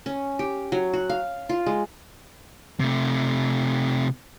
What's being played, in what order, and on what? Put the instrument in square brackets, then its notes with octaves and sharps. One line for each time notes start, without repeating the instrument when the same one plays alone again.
[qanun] C#4
G4
F#3
F#4
F5
F4
G#3
[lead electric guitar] C3 A3